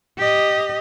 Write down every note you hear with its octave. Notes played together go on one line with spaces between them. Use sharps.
G4 D#5